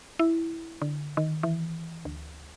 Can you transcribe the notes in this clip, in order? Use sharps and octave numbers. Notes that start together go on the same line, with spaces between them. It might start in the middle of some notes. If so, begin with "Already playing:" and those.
E4
D3
D#3
E3
D2